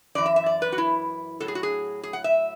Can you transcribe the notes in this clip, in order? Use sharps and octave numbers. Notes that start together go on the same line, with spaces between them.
F#2 E3 D5
E5
E5
D5
B4
F#4
E4
A2 F#3 A4
G#4
F#4
G#4
G#4
F#5
E5